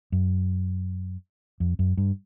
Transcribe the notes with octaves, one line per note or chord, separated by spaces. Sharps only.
F#2
F2
F#2
G2